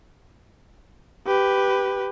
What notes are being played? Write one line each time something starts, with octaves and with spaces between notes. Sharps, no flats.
G4 B4